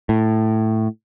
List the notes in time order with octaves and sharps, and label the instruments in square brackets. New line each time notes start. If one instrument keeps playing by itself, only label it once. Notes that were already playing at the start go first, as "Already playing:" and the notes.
[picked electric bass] A2